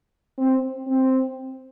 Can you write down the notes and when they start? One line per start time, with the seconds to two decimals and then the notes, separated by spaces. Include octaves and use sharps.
0.38 C4
0.87 C4